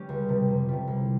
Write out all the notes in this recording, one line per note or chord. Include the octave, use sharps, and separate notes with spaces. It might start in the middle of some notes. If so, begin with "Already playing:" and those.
Already playing: G3 C#4 G4
C#2
C3 G3
F2
C3 G3
C2